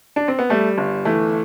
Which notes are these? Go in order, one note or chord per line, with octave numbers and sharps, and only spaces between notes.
D4
C4
B3
G3 A3
G1
E3 A3